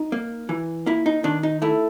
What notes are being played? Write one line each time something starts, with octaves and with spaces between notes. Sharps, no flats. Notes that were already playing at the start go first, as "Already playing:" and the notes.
Already playing: D#4
A#3
E3
A#3 E4
D#4
D#3 D4
D#4
A3 E4